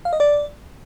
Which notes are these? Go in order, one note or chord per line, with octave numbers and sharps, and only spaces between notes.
F5
D#5
D5